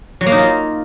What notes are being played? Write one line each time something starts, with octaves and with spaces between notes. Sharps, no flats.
F#3
A#3
D#4
F4